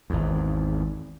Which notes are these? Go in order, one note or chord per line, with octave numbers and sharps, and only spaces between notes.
G#1 E2